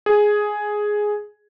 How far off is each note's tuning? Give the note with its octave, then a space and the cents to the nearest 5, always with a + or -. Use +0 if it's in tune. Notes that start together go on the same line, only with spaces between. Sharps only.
G#4 +5